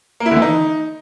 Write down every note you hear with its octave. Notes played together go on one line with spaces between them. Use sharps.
A#3
E4
D3
E3
D#4